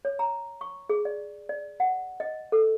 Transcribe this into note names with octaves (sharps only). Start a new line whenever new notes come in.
C#5
A#5
C#6
G#4
D5
D5
F#5
D#5
A4